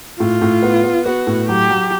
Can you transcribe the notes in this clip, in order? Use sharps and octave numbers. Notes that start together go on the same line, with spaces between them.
A2 F4
A2
B3
B3
B3 F#4
A2
F#3 G4
F#3